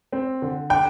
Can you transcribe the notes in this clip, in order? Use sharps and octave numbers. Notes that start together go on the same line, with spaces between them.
C4
D3
D4 G5